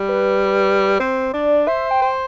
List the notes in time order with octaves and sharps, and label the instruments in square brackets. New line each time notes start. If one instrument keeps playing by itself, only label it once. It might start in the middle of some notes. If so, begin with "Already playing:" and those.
Already playing: [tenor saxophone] G3
[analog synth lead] B4
[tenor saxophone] C4 [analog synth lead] C5
[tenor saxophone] D4 [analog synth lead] D5
[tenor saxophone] C5 [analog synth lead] E5
[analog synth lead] G5
[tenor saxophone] C5